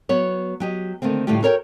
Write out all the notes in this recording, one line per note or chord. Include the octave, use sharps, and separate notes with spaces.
F#3 B3 C#5
F#3 G4 D#5
D3 D#3 A3 A#3 C4
A2 D3 G3 A3 F4 G4
F#4 A4 A#4 C#5 F5 G5